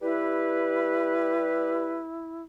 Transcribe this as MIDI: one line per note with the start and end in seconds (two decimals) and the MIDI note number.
0.01 2.01 55
0.01 2.42 64
0.01 2.01 67
0.01 2.01 71